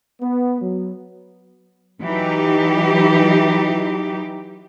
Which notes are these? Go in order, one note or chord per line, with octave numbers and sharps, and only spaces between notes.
B3
F#3
E3 F#3 D#4 G4